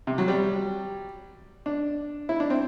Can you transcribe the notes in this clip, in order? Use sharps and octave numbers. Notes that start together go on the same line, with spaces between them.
C3
F#3
G3
D4
E4
D4
C4